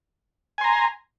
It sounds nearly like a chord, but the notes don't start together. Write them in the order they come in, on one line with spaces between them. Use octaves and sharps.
G#5 C6 A#5